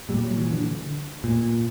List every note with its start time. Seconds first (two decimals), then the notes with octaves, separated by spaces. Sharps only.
0.09 A#2 G3
0.23 F#3
0.37 E3
0.52 D3
1.24 A#2